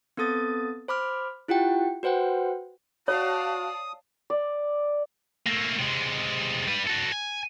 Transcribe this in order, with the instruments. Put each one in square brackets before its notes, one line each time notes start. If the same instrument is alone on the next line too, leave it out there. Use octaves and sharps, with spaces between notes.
[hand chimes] B3 C4 A4 D#6 A6
C5 B5 D6 F6
E4 F4 G4 F#5 G5
F#4 B4 C5 F#5 G5
[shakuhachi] F#4 [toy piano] C#5 [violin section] D5 F5 A5 [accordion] D#6
[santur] D5
[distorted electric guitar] A3 A#3
C3 G#3
G3 B4
F#4 A4
G#5